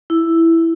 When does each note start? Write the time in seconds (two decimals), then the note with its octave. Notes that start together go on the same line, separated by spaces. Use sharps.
0.10 E4